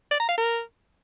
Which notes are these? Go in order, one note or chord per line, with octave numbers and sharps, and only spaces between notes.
D5
A#5
F5
A#4